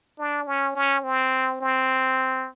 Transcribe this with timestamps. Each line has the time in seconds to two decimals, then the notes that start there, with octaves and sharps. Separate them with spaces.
0.18 D4
0.47 C#4
0.75 C#4
1.04 C4
1.61 C4